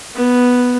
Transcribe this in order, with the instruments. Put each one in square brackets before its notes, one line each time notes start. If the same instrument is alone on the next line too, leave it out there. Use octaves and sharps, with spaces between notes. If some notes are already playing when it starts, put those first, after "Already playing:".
[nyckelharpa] B3